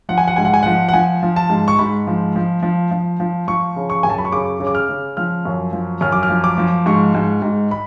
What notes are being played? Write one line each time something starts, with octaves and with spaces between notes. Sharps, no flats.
F3 F#5
G#5
F#5
G#2 G#5
F#5
G#5
F3 F#5
F#5
F3 G#5
F3
A5
G#2
C#6
G#2 B5
F3
F3
F3
F3
F3
F3 C#6
C#3
C#6
F#2 G#5
A5
B5
C#6
C#3 D6
C#3
D6
F6
C#3
F3 F6
F#2
F3
F#2 F6
D6
F6
F3
D6
F3
G#2 C#6
G#2
G#2
B5